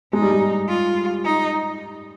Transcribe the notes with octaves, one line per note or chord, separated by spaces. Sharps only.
G#3 D#4
G3
G#3
F4
D#4